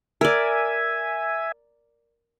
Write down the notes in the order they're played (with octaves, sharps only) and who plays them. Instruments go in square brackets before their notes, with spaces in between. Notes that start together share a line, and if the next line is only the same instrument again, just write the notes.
[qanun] A#4 D5 [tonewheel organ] E5 G#5